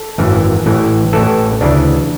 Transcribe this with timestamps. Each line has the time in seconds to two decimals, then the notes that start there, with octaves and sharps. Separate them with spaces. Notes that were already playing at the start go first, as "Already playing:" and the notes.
Already playing: A4
0.18 G#1 F#2 E3
0.66 A1 A2 E3
1.13 A1 A2 E3 A4
1.61 D2 C#3 E3 D4